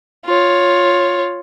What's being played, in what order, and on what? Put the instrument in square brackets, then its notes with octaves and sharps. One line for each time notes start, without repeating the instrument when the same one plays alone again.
[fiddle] F4 C#5